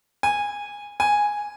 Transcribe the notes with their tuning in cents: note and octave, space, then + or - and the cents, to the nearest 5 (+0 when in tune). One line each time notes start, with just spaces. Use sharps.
G#5 -15
G#5 -5